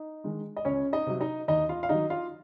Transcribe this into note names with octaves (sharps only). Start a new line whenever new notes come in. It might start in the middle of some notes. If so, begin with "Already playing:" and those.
Already playing: D#4 D#5
D#3 G#3
D#5
C#2 C#4 C#5
D#4 D#5
C3 F#3
D#4 D#5
D#2 D#4 D#5
F4 F5
F5
D#3 F#3 D#4 D#5
F4 F5